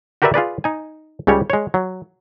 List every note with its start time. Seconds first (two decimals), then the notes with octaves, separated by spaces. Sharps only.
0.22 F#4 G4 A#4 B4 D5 E5
0.34 F4 G#4 B4 D5
0.64 D#4 G#5
1.27 C#2 C#3 G3 G4 C#5
1.50 G#3 C#5
1.74 F#3